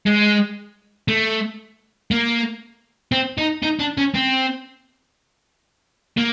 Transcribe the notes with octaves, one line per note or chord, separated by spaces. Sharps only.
G#3
A3
A#3
C4
D#4
D#4
D4
C#4
C4
A#3